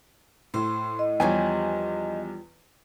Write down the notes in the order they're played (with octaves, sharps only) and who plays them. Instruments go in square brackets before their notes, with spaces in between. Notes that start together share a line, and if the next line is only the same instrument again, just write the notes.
[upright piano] A2 [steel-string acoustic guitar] C5
[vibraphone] D#5
[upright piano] E2 [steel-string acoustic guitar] F3 G3 D4 [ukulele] G4 C#5 G#5